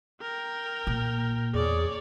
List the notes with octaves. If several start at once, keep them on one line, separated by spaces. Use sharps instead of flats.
A#4 G5
A#2
E2 G#4 C#5 D5